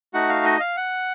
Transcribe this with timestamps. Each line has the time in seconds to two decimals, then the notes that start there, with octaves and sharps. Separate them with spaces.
0.13 A3 D#4 F#4 F#5
0.29 F5
0.44 D#5
0.60 F5
0.77 F#5